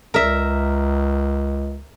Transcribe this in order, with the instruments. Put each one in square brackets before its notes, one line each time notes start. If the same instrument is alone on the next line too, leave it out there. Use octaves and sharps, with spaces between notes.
[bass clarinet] C#2 [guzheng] A#4 E5